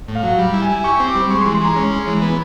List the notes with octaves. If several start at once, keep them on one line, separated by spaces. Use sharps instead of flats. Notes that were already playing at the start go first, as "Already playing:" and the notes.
A2
F5
F#3
G3
E4
G#5
E4
G4 C#6
C4
D6
G3
G#3 C#6
E3 C6
G#3 A#5
C#4
G#3
E3
B3